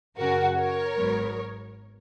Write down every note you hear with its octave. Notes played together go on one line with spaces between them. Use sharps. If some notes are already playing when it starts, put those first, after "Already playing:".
F#2 C#3 F#3 C#4 F#4 A#4
A#4 C#5
G#1 G#2 F#3 B3